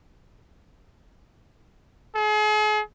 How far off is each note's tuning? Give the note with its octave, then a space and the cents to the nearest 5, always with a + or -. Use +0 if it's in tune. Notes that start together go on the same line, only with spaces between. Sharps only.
G#4 +40